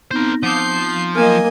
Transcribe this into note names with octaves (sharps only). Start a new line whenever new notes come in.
B3 C4 D#4 A#4 C5
F3 F#5 D6 D#6 G6 C7
F#3 A#3 D#5 G#5 F6